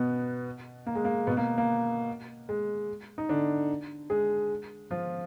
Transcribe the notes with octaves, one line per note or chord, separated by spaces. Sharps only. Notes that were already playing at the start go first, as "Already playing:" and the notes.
Already playing: B2 B3
A#3
G#3
A#3
B2 B3
A#3
A#3
G#3
D#4
D3 D4
G#3 G#4
F3 F4